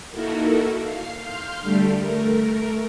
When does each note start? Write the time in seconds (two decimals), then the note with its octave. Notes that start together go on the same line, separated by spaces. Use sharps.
0.10 A#3 D#4 E4 F#4 A4 A#4
0.84 F5 C7
1.21 F5 C6 F6 G6
1.61 D3 G3 A3 G4
1.98 A3 A#4